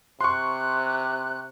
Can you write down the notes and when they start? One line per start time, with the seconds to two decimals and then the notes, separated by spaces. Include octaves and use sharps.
0.21 C3 C6 C#6 F#6